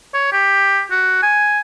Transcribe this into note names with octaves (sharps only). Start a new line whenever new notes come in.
C#5
G4
F#4
G#5